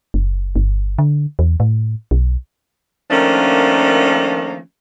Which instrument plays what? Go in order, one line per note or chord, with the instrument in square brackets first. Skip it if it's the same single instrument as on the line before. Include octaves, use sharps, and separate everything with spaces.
[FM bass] F#1
G1
D3
E2
A2
B1
[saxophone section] D#3 F3 A3 A#3 C#4 D4